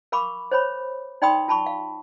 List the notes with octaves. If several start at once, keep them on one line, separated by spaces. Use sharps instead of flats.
A#4 F5 B5 C#6 D6
C5 C#5 B5
D#4 D5 G5 B5 C6 D#6
F4 A5 B5 C#6
F5